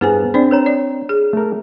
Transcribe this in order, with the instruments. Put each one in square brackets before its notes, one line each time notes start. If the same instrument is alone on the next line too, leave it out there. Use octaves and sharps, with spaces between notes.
[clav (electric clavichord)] G2 B3 [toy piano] E4 [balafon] G#4 C5 G#5
[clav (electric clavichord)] C4 [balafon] D4 C5 D5
[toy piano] B4 C#5 A#5
[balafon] D5
G#4
[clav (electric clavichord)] A3 A#4